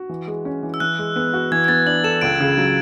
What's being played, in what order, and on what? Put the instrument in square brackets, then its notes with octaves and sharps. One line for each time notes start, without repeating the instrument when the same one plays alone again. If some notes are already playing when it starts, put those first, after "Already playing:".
Already playing: [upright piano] F#4
E3
G#3
C#4
E3
[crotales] E6
[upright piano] E3 [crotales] F#6
[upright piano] G#3
B3
F#4
[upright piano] E3 [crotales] G#6
[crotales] G#6
[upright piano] B3 [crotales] A6
[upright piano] D4 [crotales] F#7
[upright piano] A4 [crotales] E7
[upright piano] C#2 [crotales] D7
[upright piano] C#3
F#3